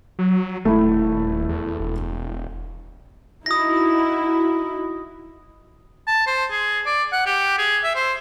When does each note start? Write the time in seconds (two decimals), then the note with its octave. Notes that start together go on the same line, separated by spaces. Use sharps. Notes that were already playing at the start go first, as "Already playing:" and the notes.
0.19 F#3
0.65 D#1 A3 E4
1.49 E2
1.79 E1
3.46 D#4 E4 F#4 D#6 A#6
6.07 A5
6.27 C5
6.50 G#4
6.86 D5
7.12 F#5
7.26 G4
7.58 G#4
7.84 E5
7.96 C5